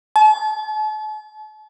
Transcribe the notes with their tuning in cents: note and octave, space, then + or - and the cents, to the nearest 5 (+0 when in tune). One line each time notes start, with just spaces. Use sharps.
A5 -40